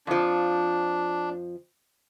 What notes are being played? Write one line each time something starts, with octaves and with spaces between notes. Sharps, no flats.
F2 F3 D4